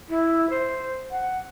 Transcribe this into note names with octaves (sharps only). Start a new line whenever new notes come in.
E4
C5
F#5